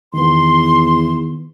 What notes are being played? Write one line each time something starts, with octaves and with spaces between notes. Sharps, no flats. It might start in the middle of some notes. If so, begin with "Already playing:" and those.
E2 D#3 B3 C6